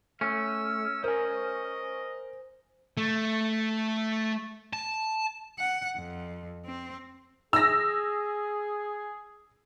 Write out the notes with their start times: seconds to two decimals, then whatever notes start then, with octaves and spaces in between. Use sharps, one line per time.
0.21 A3 C#4 E6
1.04 A#4 C5 D#5 G#5
2.97 A3
4.73 A5
5.59 F#5
5.96 F2
6.65 C4
7.53 G#4 E6 A#6